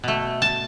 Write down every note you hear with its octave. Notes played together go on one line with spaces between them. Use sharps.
B2 A3
A5